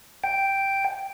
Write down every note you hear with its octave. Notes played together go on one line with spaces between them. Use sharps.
G5